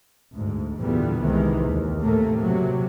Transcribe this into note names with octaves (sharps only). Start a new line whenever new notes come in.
D2 G#2
E2 A#2 D3 E3 G3 B3
C2 C3 D#3 E3 G#3
D#2
A2 C3 A3 A#3
C3 F#3